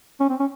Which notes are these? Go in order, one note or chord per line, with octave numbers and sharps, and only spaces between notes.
C#4
C4
C#4